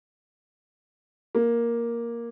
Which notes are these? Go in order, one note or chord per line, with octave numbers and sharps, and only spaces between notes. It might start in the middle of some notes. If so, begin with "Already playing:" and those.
A#3